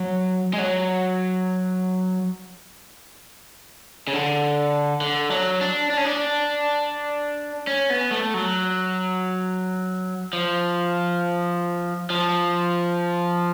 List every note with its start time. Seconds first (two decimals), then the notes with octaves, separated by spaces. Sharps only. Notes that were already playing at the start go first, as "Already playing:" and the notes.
Already playing: F#3
0.53 G#3
0.59 F#3
4.07 C#3
4.13 D3
5.01 D3
5.31 F#3
5.61 D4
5.90 D4
5.97 C#4
6.05 D4
7.67 C#4
7.90 B3
8.11 A3
8.34 F#3
10.33 F3
12.10 F3